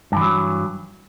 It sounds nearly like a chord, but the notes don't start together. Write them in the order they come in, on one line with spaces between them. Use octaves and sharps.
G2 E3 F#3